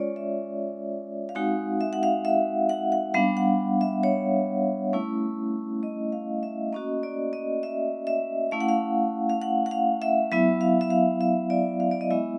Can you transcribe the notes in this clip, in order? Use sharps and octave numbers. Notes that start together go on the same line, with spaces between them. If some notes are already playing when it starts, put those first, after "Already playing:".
Already playing: G#3 C#4 F4 C#5 D5
E5
F5
G#3 C4 D#4 F#4 F#5
E5
F#5
F5
E5
F#5
F#5
G3 B3 D4 F5
F#5
E5
C#5
A3 C#4 E4
D#5
F5
E5
A#3 C#4 F#4 D#5
D5
D#5
E5
E5
A3 C#4 E4 F5
F#5
F5
F5
F#5
F#5
F5
E5
F#3 B3 E4 E5
F5
E5
F5
E5
D5
F5
D5
D#5
G#3 B3 E4 E5